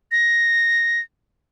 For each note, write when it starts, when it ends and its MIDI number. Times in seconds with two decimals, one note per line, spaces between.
0.12 1.00 94